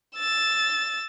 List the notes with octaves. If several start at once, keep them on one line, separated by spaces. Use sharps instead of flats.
E6 A6